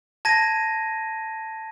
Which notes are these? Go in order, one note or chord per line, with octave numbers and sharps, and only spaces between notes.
A5 G#6 A#6 D#7